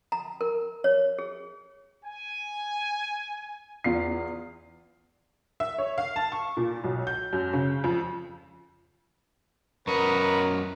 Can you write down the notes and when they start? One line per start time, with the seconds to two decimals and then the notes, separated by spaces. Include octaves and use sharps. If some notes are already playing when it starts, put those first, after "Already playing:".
0.12 A#5
0.41 A#4
0.84 C#5
1.19 G#4
2.03 G#5
3.84 E2 F4 C7
5.60 E5
5.78 C#5
5.98 F5
6.16 A5
6.32 C#6
6.57 A#2
6.84 B1
7.07 G6
7.33 F#2
7.53 C#3
7.84 F2
9.87 F#2 A#4 B4 D#5 A#5 C#6